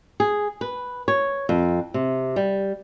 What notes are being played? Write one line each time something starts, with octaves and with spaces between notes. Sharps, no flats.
G#4
B4
C#5
F2
C3
G3